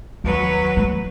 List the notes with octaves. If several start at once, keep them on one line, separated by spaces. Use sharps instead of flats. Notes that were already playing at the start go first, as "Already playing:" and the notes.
D#2 F#3 B4
A3